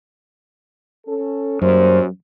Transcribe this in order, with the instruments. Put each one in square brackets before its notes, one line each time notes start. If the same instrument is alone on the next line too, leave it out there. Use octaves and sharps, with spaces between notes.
[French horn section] C#4 A4
[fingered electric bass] F#2 [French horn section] G3 A#3 C5